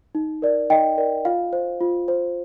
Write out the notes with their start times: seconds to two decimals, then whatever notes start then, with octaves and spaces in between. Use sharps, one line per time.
0.15 D#4
0.42 A#4 D5
0.70 D#4 D#5 G5
0.98 A#4 D5
1.25 F4 F5
1.53 C5
1.80 F4
2.08 C5